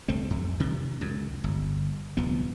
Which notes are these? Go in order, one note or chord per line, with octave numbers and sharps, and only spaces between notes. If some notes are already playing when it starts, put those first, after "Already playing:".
C2 A3 C4
F2
C3 D#3
C#2 F#2
G1
D1 C2 F3 B3